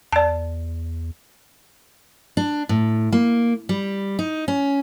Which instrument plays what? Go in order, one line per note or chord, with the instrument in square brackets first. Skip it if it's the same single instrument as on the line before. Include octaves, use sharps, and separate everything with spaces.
[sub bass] E2 [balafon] D5 A5
[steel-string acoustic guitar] D4
A2
A#3
G3
D#4
C#4